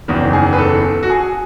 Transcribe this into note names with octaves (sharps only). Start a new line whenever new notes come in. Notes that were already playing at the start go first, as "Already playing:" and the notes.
F#1 E2 D#3
G#4
B4
A4
F#4
G#4